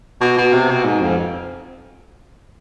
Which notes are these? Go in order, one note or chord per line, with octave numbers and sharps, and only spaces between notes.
B2
B2
C3
B2
G#2
F2